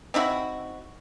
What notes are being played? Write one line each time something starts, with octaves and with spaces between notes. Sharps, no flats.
C4 D#4 E4 F#4